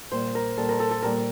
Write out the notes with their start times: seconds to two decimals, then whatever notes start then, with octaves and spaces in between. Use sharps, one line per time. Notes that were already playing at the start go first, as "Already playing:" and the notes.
0.12 A#2 G3 A#3 C5
0.35 A#4
0.58 A#2 G3 A#3 A4
0.69 A#4
0.80 A4
0.91 A4
1.02 A#2 G3 A#3 A#4